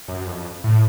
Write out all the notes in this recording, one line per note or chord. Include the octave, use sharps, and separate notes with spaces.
F#2
F2
A2